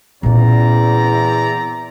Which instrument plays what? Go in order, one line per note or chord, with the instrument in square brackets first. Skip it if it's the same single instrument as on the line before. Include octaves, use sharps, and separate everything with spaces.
[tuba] E2 [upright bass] A#2 C#4 [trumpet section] C4 D5 A#5